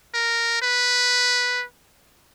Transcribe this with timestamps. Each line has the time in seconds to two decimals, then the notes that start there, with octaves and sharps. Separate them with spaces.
0.14 A#4
0.62 B4